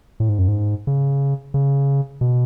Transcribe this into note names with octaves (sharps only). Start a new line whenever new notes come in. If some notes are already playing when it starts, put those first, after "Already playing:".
A2
G#2
F#2
G#2
C#3
C#3
B2